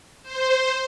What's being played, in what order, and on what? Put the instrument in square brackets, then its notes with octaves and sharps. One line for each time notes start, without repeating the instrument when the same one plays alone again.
[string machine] C5